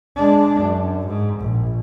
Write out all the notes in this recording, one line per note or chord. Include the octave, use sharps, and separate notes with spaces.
G#3 D4
F#2
G#2
A#1